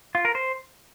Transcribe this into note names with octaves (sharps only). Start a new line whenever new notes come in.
F4
A#4
C5